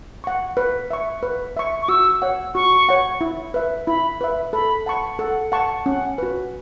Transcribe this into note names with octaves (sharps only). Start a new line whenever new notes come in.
F#5 C#6
B4
E5 C#6
B4
E5 C#6
C#6
F#4 E6
C#5 F#5
F#4 C#6
C#5 F#5
E4
B4 E5
E4 B5
B4 E5
A4 B5
F#5 A5 C#6
A4 F#5
F#5 A5 C#6
C#4 F#5
F#4 B4